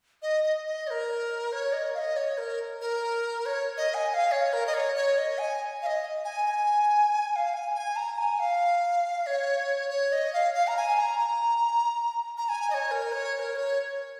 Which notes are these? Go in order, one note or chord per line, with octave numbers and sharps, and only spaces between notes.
D#5
D#5
D#5
C#5
A#4
C#5
D#5
F5
D#5
C#5
A#4
A#4
C#5
D#5
G#5
G#5
F5
C#5
A#4
D#5
C#5
C#5
D#5
G#5
F5
D#5
G#5
G#5
G#5
F5
G#5
G#5
A#5
G#5
F5
C#5
C#5
D#5
F5
F5
A#5
G#5
A#5
A#5
A#5
G#5
D#5
C#5
A#4
C#5
C#5
A#4
C#5